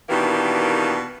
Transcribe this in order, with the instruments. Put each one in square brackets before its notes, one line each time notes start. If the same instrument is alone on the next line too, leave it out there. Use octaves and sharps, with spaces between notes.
[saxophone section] B2 D#3 E3 A#3 D4 G4